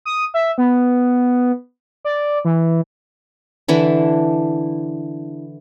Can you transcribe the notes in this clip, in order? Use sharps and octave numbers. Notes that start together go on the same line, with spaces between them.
D#6
E5
B3
D5
E3
D3 E3 D4 E4